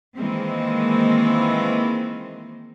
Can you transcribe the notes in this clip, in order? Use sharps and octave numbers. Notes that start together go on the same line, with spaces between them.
D#3 E3 G#3 A#3 C4